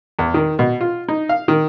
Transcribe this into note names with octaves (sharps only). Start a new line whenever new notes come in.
E2
D#3
B2
F4
D#4
F5
D#3